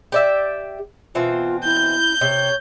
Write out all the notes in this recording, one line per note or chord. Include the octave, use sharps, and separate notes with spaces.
G4 D5 E5
B2 E3 C4 F4
E4 G6
C3 C#5